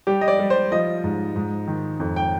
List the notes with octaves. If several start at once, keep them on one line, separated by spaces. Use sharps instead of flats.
G3 G4
D#5
D5
G3
C5
F3 D#5
G#2
G#2
D#3
F2
G5